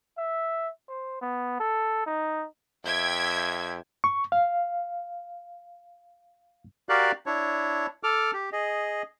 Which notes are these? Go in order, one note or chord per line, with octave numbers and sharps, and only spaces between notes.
E5
C5
B3
A4
D#4
F2 E5 G5 G#6
C#6
F5
F#4 G4 A#4 D5 F5 F#6
D4 E4 C#5
A4 D6 F6
G4
G#4 D#5